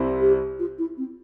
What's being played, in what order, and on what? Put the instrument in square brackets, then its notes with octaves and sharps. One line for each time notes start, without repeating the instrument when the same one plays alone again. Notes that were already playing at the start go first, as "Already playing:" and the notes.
Already playing: [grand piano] C2 C3 G3 C4 E4
[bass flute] G4
F4
E4
C4